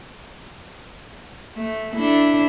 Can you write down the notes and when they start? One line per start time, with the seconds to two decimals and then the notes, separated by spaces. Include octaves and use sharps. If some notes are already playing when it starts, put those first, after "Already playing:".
1.55 A3
1.93 D4 E4 A4